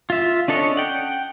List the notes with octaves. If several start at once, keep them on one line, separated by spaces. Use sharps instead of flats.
F4 E5
C#4 D4 A4 C#5 D#5
F#5 G5